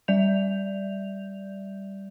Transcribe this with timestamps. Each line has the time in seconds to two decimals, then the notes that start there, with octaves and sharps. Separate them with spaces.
0.08 G3 D5 E5 G6 F7